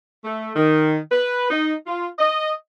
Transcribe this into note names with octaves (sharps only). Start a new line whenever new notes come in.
A3
D#3
B4
D#4
F4
D#5